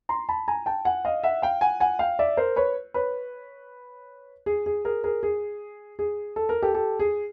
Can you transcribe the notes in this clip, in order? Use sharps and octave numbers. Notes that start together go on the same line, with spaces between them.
A#5 C6
A5 B5
G#5 A#5
G5 A5
F#5 G#5
D#5 F5
E5 F#5
F5 G5
F#5 G#5
F#5 G#5
F5 G5
D5 E5
A#4 C5
B4 C#5
B4 C#5
G#4
G#4
G#4 A#4
G#4 A#4
G#4
G#4
A4
A#4
G4 A4
G4 A4
G#4